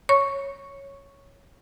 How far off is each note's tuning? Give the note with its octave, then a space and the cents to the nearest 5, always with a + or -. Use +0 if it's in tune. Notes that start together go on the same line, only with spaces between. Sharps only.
C#5 -5 C#6 +0